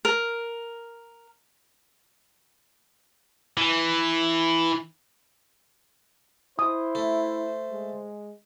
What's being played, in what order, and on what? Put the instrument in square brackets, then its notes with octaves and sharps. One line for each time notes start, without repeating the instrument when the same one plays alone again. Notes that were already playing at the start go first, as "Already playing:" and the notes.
[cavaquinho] A#4
[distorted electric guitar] E3
[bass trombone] E4 [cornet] C5 [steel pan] D#6
[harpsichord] A3
[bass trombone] G#3